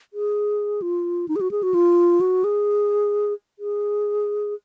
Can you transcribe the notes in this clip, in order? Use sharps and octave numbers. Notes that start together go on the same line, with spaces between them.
G#4
F4
D#4
G#4
F#4
G#4
F#4
F4
F#4
G#4
G#4